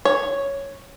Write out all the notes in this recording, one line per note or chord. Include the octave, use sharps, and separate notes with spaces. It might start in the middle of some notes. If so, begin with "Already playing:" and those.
C#5